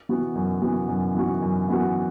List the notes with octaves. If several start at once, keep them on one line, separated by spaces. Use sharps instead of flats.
E3 B3 F#4
F#2
E3 B3 F#4
F#2
E3 B3 F#4
F#2
E3 B3 F#4